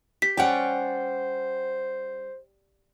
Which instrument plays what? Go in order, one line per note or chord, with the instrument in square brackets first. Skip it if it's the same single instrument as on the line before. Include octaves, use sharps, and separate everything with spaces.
[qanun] G4 [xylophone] B6
[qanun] G3 C#4 D5 [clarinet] C5 [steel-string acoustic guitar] F#5 G5